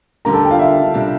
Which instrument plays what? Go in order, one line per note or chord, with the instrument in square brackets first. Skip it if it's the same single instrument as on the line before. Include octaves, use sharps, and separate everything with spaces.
[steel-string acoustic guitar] D2 D3 G3 [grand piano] A#4 A#5
[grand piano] A4 A5
G5
F4 F5
E5
[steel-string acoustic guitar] C3 G3 D4